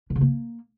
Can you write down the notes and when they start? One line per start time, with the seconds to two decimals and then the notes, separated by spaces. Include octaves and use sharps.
0.10 D3
0.16 C#3
0.21 A#3